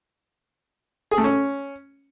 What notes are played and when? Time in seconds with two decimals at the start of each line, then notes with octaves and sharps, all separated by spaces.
1.11 G#4
1.18 A3
1.24 C#4